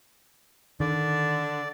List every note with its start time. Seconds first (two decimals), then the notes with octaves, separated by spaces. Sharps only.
0.80 D3 D#3 D5